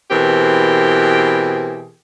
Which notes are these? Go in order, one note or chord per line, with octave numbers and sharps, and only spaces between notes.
B2 E3 C4 G4 G#4 A#4